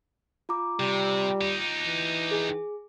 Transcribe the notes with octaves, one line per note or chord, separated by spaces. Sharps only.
F4 A#5 D6
C3 G3
D#4 G4
E3
G#4